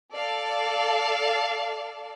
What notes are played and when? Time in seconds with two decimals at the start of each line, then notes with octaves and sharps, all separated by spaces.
0.14 A4 D5 F5 A5